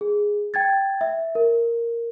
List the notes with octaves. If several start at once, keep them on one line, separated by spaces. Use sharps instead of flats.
G#4
G5 G#6 A6
E5
A#4